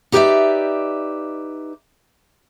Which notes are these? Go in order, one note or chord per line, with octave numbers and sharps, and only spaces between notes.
D#4 G4 B4 C#5 D5 E5